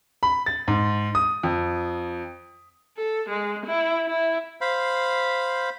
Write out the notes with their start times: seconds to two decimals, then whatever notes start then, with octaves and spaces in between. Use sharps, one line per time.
0.23 B5
0.46 A6
0.68 G#2
1.15 D#6
1.43 F2
2.97 A4
3.29 G#3
3.66 E4
4.06 E4
4.61 C5 F5 B5